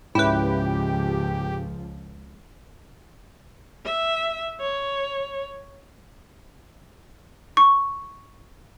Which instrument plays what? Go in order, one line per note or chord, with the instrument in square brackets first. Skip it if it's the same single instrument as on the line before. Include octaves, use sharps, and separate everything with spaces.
[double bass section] C#2 F3 [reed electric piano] G#2 C#4 [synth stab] E4 B4 [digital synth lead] G4
[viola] E5
C#5
[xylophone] C#6